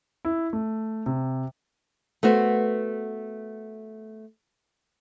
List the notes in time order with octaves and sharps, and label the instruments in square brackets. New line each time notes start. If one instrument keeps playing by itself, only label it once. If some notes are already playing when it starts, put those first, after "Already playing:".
[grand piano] E4
A3
C3
[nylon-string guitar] A3 B3 F#4 C5